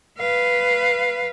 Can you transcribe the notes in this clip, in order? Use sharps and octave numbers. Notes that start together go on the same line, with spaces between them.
B4 F5